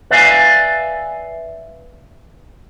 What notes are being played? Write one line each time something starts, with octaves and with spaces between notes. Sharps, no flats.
B4 D5 E5 F5 G#5